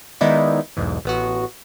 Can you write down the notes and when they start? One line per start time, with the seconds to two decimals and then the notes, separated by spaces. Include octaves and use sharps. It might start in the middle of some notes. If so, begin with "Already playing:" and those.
0.21 D#3 G#3 B3 D#4 E4 D5
0.77 B1 E2 G#2 E3
1.05 A1 B3 F#4